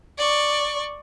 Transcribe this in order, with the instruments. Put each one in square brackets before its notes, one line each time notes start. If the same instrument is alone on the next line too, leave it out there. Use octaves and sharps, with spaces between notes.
[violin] D5 C#6